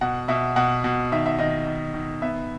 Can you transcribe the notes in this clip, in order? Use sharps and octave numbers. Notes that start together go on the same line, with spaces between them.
B2 F#5
B2 E5
B2 F#5
B2
D#3 E5
E5
D#3 D#5
D#3
D#3
B3 E5